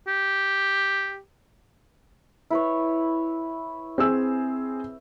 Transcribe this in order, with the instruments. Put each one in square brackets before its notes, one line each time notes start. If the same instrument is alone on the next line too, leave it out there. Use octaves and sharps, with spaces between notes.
[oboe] G4
[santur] E4 B4 C#5
[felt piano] C4 G#4 E6